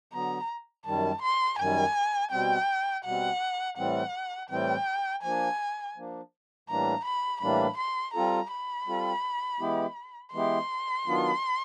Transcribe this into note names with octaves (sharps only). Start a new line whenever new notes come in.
D3 F#3 B3 A#5
F#2 D#3 G3 A5
C6
F#2 D#3 G3 G#5
B2 G3 C4 G5
B2 G3 C4 F#5
A2 E3 G3 C4 F#5
A2 E3 G3 C4 G5
F3 A#3 D4 G#5
F3 A#3 D4
A2 E3 G3 A#3 D4 A#5
B5
A2 E3 G3 A#3 D4 B5
C6
G3 C4 F4 A4 A#5
B5
G3 C4 F4 A4
E3 G#3 B3 E4 G4
E3 G#3 B3 E4 G4 C6
D#3 F#3 B3 D4 F4